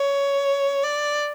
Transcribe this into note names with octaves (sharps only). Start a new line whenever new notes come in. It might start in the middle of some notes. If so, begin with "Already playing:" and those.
Already playing: C#5
D5